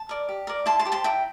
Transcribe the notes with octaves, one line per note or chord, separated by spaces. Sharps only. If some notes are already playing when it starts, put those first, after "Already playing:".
Already playing: A5
A#4 D5
G4
A#4 D5
E4 A5 C6
A5 C6
G4 C5
A5 C6
E4 G5 A#5